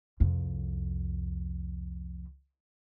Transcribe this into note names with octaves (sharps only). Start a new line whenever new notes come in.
C2 F2